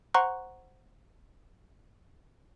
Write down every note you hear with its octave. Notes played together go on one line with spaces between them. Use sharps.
C5 F#5 A#5 C6 C#6 F#6